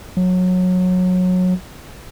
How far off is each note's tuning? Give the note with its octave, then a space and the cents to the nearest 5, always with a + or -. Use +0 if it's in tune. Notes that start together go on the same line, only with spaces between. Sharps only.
F#3 -20